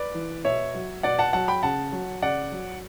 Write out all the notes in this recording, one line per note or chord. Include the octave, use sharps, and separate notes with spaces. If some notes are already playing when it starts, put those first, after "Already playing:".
Already playing: B4 D5
E3
B2 C#5 E5
F#3
B2 D5 F#5
F#5 A5
F#3 F#5 A5
G5 B5
C#3 F#5 A5
F#3
C#3 D5 F#5
F#3